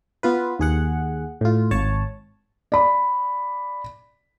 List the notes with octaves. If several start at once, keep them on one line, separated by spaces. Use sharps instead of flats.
B3 F4 B4
D#2 G#4 F#5
A2 F4
G#1 C#5 A5
D5 B5